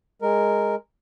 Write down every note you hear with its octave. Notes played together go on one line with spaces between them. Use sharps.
G#3 A#4